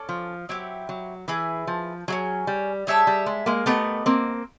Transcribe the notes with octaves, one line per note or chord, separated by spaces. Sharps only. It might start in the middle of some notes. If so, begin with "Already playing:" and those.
Already playing: C#4 A4 D5
F3
F#3 C4 E4 G4
F#3
E3 E4 G#4 B4
F3
F#3 C#4 E4 G#4
G3
G3 G#4 C#5 E5 A5
G3
G#3
G#3 A#3
A3 B3 G4 A#4 D#5 F#5
A#3 C4